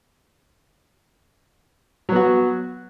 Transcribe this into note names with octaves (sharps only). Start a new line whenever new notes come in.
F#3 B3 F#4